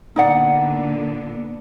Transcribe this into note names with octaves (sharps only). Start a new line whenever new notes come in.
A#2 D3 B3 D#4 D5 F#5